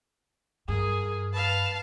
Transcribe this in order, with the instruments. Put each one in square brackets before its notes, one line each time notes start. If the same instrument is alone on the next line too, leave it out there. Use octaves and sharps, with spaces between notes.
[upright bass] G2 [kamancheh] G#4 A#4
[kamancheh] B4 [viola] F5 A5